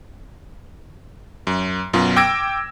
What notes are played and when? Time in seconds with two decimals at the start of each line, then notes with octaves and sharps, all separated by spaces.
1.47 F#2
1.93 F#2 B2 F4
2.16 G5 D6 E6 G#6 A#6 D7